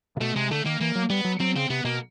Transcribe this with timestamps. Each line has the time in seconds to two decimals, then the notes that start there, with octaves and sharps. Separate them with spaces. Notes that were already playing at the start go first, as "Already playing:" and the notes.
0.17 C3
0.21 B2 A3
0.36 C3 G#3
0.51 D3 A3
0.65 D#3 A#3
0.80 E3 A#3
0.95 F#3
1.10 G3 B3
1.24 F#3
1.40 F#3 C4
1.55 C#3 C4
1.70 C3 B3
1.84 B2 A#3